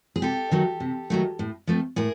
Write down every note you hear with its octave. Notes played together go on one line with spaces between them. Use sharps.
G#4
C3 G4 A4
D#3 F#3 A3
C3
D#3 F#3 A3
A2
F3 A3 C4
A2 G#4 A#4